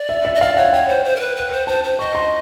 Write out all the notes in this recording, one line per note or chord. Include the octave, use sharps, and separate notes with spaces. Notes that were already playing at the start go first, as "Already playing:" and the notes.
Already playing: D5
E5
E5
D#5
D5 F5
C#5 F#5
C#5 G5
C5
C5
A#4
B4
B4
C5
C5 A5
C5
D#5 C#6
C6